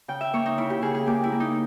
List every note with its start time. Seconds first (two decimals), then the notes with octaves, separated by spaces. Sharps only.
0.08 C#3 G5
0.21 E5
0.33 A#3 C#5
0.46 D#4
0.58 C#3 E4
0.70 G4
0.82 C#3 G#4
0.94 G#4
1.06 A#3 G4
1.24 E4
1.32 A#3
1.40 D#4